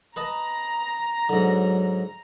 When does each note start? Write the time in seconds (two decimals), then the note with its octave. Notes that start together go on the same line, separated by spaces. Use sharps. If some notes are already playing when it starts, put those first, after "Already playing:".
0.16 B4 D#5 A5 A#5
1.29 G#2 D3 F#3